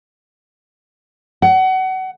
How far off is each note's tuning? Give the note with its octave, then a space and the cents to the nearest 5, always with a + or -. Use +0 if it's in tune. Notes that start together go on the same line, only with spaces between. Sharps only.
F#5 +30